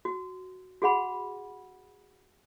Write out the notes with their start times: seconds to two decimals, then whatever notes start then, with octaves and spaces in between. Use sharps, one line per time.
0.05 F#4
0.82 F#4 G#4 F#5 B5